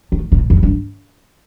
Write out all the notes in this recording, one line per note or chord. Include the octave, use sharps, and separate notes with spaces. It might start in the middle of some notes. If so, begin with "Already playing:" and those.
D#3
A#2
F2
G2